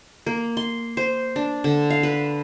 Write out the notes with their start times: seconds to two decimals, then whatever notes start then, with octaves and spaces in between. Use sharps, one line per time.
0.26 A#3
0.57 C6
0.97 C5
1.36 D4
1.64 D3
1.90 F5
2.03 B4